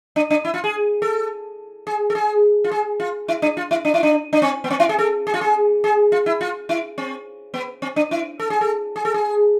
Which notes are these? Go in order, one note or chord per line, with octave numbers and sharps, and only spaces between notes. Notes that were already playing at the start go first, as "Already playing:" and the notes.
D4
D4
E4
F4
G#4
A4
G#4
A4
G#4
F4
G#4
F4
E4
D4
F4
E4
D4
E4
D4
D4
C4
B3
C4
E4
G#4
A4
G#4
F4
G#4
G#4
F4
E4
F4
E4
C4
B3
C4
D4
E4
A4
G#4
A4
G#4
A4
G#4